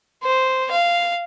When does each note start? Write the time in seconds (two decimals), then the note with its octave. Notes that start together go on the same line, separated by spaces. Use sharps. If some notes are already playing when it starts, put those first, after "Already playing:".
0.23 C5
0.71 F5